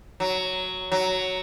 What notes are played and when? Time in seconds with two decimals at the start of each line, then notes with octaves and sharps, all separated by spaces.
0.20 F#3
0.92 F#3